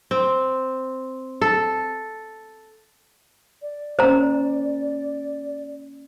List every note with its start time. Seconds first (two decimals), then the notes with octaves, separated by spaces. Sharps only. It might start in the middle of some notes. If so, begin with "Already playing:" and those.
0.11 C4
1.41 A4
3.62 D5
3.99 A#3 C#4 C5 A#5